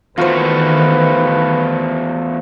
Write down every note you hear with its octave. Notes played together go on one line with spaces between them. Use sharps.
E2 D#3 A3 F4 F#4 B4 C5